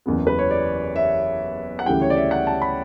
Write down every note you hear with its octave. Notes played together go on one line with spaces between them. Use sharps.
F#1 E2 C#3 E3 B3
B4
C#5
D5
E5
F#5
D2 C#3 E3 G3 G5
C#5
D5
E5
F#5
A5
B5